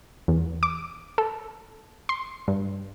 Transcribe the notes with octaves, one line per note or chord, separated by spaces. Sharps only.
E2
D6
A4
C6
G2